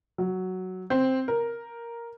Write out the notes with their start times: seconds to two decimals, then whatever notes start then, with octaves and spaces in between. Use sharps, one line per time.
0.18 F#3
0.90 C4
1.28 A#4